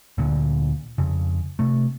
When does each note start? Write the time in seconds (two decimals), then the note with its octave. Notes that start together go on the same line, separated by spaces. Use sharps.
0.18 D2 A#2 D3
0.98 F2 C#3
1.59 C3 A3